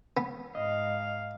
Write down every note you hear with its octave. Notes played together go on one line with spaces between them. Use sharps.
B3
G#2 D#5 F5